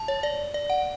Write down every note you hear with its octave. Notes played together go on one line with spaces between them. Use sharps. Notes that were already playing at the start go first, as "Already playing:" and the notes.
Already playing: A5
C#5
D5
D5
F#5